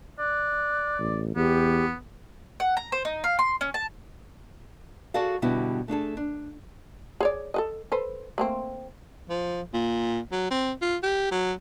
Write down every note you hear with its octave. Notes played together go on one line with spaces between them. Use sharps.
D5 F#6
A1
E2 B3 G4
F#5
A#5
C5
D#4
F5
C6
C#4
A5
F#4 G#4 A4 D5 F5
B2 D3 G3 B3 E4 F#4
A3 D4 G#4 A4
D4
G#4 C#5 D5
A4 B4 D#5
A4 B4 C5
A3 A#3 C4
F3
A#2
F#3
C4
F4
G4
F#3